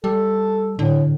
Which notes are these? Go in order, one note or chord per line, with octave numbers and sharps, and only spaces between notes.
G3 A4
A2 D3